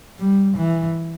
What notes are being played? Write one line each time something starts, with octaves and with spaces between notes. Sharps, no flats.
G3
E3